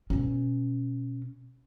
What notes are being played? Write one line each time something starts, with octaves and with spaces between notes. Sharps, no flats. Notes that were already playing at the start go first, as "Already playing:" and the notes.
B2 C#4